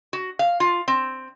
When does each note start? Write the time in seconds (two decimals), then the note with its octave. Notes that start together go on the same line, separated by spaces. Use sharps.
0.13 F#4
0.39 F5
0.60 F4
0.88 C4